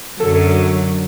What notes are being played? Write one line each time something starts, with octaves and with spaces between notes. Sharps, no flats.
F#2 D3 F#3 A4